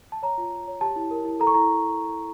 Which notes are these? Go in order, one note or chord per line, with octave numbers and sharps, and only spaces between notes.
A5
C#5 A#5
F4
F4
C#5
G4 A5
E4
A#4
E4
A4 A#5
C#6
E4 A#5